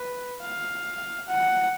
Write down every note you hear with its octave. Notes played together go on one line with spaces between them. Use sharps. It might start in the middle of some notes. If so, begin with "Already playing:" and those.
Already playing: B4
F5
F#5